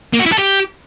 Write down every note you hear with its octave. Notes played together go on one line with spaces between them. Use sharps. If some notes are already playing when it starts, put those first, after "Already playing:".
A#3
F#4
E4
A4
G4